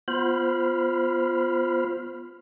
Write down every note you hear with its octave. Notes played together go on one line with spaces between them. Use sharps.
B3 F4 C5 B5 F6